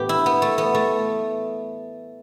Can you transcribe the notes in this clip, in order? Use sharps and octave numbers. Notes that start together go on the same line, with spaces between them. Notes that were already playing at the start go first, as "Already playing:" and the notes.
Already playing: A2 E3 B3 G4
E4
B3
A3
B3
A3